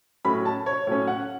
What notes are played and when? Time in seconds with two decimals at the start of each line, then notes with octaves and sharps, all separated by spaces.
0.25 A2 F#3 C#4 B5
0.45 A5
0.66 C#5
0.87 A2 F#3 C#4 C#5
1.07 F#5